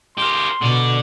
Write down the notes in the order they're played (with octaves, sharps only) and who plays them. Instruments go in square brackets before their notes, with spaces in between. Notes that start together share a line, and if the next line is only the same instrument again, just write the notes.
[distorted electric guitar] G4 A#4 [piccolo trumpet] C6
[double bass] B2 [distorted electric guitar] D3 D5